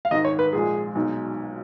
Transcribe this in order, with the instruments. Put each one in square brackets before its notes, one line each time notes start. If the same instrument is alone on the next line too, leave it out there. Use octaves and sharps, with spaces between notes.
[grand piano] F5
[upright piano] G#1 G#2 D#3 [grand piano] D#5
[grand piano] C#5
B4
[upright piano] A#1 A#2 G#3 [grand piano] G#4
[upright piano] B1 B2 G#3 D#4